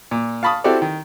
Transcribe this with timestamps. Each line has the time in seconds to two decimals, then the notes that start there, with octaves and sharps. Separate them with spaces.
0.11 A#2
0.43 F5 A5 B5 C#6 D#6
0.64 C4 E4 F#4 G4 A4 D5
0.82 D#3